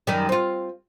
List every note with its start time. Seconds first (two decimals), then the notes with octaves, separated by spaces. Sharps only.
0.07 F#2 D#3 G3
0.29 C4 F4